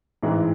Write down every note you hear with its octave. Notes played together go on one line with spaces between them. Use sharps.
A1 G#2 E3 G#3